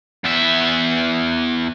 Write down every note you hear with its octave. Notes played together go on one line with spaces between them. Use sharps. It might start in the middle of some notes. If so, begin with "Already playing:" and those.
E2 E5